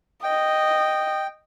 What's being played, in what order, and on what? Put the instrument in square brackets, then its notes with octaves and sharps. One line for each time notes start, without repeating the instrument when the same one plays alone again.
[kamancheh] D#5 [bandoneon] G5